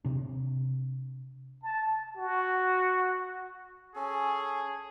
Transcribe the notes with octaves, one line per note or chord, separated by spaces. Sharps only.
C3 D4
A5
F#4
C#4 G#4 A4